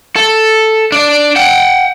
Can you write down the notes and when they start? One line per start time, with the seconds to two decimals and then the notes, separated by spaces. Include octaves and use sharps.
0.16 A4
0.92 D4 D5
1.36 F#5 G5